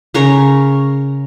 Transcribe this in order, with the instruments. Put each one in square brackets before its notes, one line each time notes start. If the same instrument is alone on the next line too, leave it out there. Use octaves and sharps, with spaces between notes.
[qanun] C#3 A#4 C#5